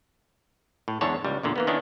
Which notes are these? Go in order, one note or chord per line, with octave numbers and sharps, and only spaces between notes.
A2
E2 G#2 D3 D4 C#5 A5
C#2 G3
E2 A#2 D3
E3 A#3 B3
D#3 B3 C#4 D4 E4